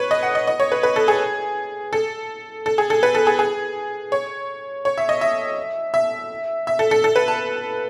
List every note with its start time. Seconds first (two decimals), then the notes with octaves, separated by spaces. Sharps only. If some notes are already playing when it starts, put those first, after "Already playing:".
Already playing: B4 C#5
0.11 D#5
0.23 F#5
0.35 D#5
0.47 D#5
0.60 C#5
0.72 B4
0.83 B4
0.96 A4
1.08 G#4
1.93 A4
2.66 A4
2.78 G#4
2.90 A4
3.03 B4
3.15 A4
3.27 G#4
3.39 G#4
4.12 C#5
4.85 C#5
4.98 E5
5.09 D#5
5.21 E5
5.94 E5
6.67 E5
6.79 A4
6.91 A4
7.04 A4
7.16 B4
7.28 A5